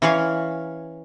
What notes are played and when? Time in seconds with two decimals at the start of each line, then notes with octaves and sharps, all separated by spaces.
0.02 E3 C#4 C#5 F5